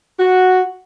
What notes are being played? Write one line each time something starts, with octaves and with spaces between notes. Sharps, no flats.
F#4